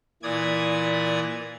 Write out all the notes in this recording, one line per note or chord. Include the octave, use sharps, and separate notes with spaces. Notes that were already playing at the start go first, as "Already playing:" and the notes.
A#2 E3 D5 D#6 G#6